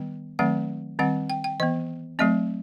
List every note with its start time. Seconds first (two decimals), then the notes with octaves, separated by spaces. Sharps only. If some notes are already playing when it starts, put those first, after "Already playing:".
Already playing: D#3 G3 B3
0.39 D#3 F#3 A3 C4 F#5
0.99 D#3 G3 C4 F#5
1.30 G5
1.44 G5
1.60 E3 B3 D#5
2.19 F#3 A3 C4 D#5